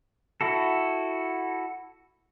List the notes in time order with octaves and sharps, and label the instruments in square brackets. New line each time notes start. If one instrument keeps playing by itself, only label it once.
[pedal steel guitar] E4 F#4 A4